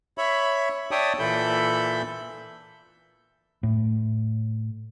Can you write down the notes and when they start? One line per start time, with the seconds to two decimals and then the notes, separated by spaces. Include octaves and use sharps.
0.18 C#5 E5 B5
0.91 C#5 D5 E5 G5 A5 D#6
1.19 A#2 E3 A4 E5 B5 G6
3.63 A2